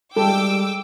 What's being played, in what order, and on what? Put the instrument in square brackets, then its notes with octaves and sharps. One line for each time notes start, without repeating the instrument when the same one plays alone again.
[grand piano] G3 G#3 [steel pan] A4 [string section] G5 D6 E6